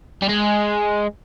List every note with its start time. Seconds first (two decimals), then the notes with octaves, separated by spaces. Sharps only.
0.22 G3
0.29 G#3